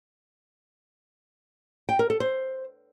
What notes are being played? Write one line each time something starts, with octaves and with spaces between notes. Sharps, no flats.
G5
A#4
A4
C5